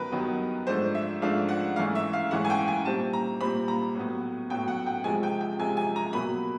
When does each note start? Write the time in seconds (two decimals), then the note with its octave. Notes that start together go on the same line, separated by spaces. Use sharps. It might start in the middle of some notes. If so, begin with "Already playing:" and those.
Already playing: G2 D#3 F#3 B3 A#4 B4
0.12 G2 D#3 F#3 B3
0.67 G#2 F3 A3 D4 C5
0.95 E5
1.22 G#2 F3 A3 D4 F5
1.49 F#5
1.76 G#2 E3 A3 C#4 F5
1.95 E5
2.13 F5
2.31 G#2 E3 A3 C#4 F#5
2.45 G#5
2.50 G5
2.68 G#5
2.85 A#2 G3 C4 A5
3.13 A#5
3.41 A#2 G3 C4 B5
3.68 A#5
3.95 A2 F#3 B3
4.50 A2 F#3 B3 G5
4.68 F#5
4.86 G5
5.04 C3 F3 G#3 G#5
5.23 G5
5.41 G5
5.59 C3 F3 G#3 G#5
5.77 G#5
5.96 A#5
6.13 B2 F#3 A#3 B5